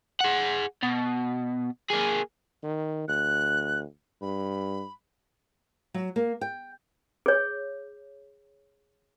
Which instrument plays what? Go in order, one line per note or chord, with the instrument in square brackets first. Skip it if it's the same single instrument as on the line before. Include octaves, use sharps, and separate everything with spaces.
[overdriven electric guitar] G#4 F#5
B2
A#3 G#4
[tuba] D#3
[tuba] D2 [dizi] F#6
[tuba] G2 [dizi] B5
[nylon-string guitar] F#3
A#3
G5
[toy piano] G#4 C#5